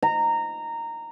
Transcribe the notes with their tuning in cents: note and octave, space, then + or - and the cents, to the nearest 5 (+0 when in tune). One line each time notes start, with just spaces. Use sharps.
A#5 -15